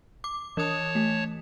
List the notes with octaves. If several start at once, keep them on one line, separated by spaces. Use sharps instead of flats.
D6
E3 C#5 A5 D#6
A3